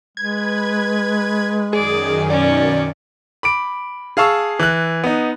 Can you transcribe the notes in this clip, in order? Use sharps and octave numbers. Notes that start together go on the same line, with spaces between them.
G#3 B4 G#6
F#2 D#3 G#4 D5
B2 C#4 D5
B5 D6 D7
G#4 F5 A5 C#6 E6
E3 F#6
B3 D#4